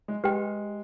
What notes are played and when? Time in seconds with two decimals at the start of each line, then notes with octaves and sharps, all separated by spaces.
0.08 G#3
0.24 G#3 G4 B4 G5